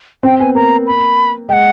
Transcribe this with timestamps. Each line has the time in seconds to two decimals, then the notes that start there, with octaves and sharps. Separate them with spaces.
0.23 C4 G5
0.39 B3 G#5
0.55 A#3 A#5
0.87 B5
1.49 G#3 G5
1.53 F#5